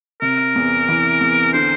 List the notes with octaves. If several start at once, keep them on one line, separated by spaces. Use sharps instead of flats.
C3 A#4
E2
E3
E2
D3 C5